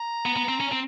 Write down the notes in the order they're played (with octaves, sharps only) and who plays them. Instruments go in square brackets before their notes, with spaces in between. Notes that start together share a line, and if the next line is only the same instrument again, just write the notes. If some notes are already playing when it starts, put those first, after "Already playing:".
Already playing: [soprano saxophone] A#5
[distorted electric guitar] B3
B3
C4
C#4
C4